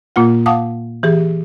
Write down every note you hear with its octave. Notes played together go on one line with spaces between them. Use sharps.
A#2 A#3 F4 F#5
F5 F#5 A5 D6 D#6
E3 G4 G#4